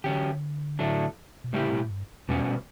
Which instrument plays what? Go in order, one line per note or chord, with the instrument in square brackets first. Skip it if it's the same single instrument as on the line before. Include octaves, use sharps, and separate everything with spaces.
[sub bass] D3 [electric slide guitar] F#3 C#4 G4
[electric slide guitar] A2 F#3 A3 D4
[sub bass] B2
[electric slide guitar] A2 G3 C#4 E4 G4 [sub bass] C#3
[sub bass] B2
A2
G2
[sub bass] E2 [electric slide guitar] B2 G3 C#4